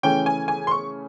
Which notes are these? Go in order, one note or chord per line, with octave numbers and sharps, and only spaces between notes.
C#3 E3 A3 C#4 G5
G#5
G#5
C6
C#6